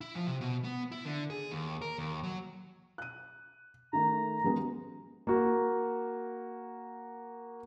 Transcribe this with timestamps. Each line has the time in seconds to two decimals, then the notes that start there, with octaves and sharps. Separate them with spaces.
0.01 E4
0.15 F3
0.27 C3
0.41 B2
0.64 B3
0.92 E4
1.05 D3
1.30 G#4
1.52 D#2
1.82 A#4
1.98 D#2
2.23 F#3
2.98 F#6 D#7
3.93 D#3 A3 A#5
4.44 F#3 G#3 B3
5.27 A#3 F#4